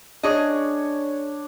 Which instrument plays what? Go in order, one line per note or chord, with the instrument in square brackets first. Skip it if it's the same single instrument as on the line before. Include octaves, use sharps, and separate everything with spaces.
[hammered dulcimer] D4 C#5 [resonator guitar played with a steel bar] G#4 D#5